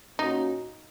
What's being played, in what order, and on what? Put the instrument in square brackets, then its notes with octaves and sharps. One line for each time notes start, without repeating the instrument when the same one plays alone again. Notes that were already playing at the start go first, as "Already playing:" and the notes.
[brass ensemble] A#2 A#3 C#4 F#4 [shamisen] D#4